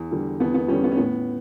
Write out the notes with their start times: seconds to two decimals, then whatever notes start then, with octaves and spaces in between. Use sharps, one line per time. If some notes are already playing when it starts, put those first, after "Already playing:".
Already playing: E2
0.11 D3 G3
0.40 E2 B3
0.54 B3
0.68 D3 G3 C#4
0.84 B3
0.92 C#4
0.97 A2 B3